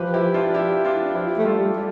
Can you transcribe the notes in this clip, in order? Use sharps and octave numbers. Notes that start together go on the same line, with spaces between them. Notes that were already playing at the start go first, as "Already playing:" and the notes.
Already playing: F3 G4 B4
E4 G4
D4 F4
E4 G4
D4 F4
F3 E4 G4
A3
G3 F4 A4
G3